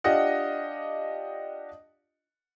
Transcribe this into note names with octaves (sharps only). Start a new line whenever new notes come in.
D4 F4 G4 D#5 F#5